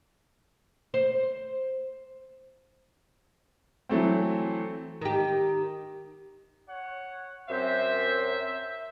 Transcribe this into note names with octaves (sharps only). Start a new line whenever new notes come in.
C5
E3 F#3 A3 C4
D#3 G4
C#5 F#5
F#2 C4 C5 E5